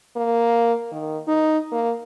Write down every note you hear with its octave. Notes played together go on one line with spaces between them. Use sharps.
A#3
D#3
D#4
A#3